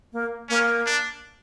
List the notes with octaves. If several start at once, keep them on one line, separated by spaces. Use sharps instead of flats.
A#3
A#3 C#4
D4